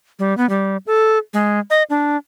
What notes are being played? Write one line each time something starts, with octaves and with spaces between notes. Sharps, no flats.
G3
B3
G3
A4
G#3
D#5
D4